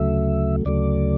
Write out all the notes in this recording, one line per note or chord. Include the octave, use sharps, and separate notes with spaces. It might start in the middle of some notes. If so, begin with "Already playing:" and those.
Already playing: D2 C#3 F#3 A3 E5
D2 C#3 F#3 A3 D5